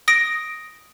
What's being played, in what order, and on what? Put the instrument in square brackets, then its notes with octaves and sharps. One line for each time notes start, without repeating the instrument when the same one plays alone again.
[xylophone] D#6 A#6 D7